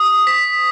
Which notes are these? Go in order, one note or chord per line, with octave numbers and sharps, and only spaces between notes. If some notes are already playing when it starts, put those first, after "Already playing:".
Already playing: D#6
B6